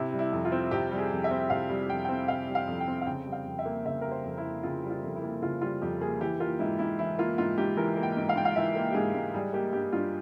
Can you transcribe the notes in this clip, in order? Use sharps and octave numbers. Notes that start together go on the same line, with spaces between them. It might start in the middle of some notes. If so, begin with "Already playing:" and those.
Already playing: C3 E4
G3
E4
F2
F4
C4
C3 G4
G3
G#4
F2
E5
C4
C3 F5
G3
F2 G5
C4 G5
C3 F5
G3
F5
F2
G5
C4
F5
C#3 G5
G3
F5
F2
E5
A#3
C#3 E5
G3 A#4
C5
F2
E4
A#3
C#3 F4
G3
F4
F2
E4
A#3
C#3 F4
G3 F4
F2 G4
A#3 G#4
E3 G4
A#3 F4
G#2 E4
G#2 E4
E3 E4
A#3 F4
G#2 F4
G#2 G4
E3 A#4
A#3
G5
G#2
F5
G#2 G5
F5
E3 E5
A#3
G4
G#2 G#4
G#2
G3 G#4
A#3 G4
G2 G4
G2 F4